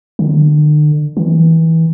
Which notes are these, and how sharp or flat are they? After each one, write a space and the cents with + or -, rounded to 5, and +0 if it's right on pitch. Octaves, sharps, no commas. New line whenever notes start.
D3 +40
E3 -25